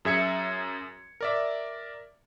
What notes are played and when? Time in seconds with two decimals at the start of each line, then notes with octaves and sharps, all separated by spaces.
0.05 F#2 G#4 E5 G#6 C#7
1.21 A#4 D5 E5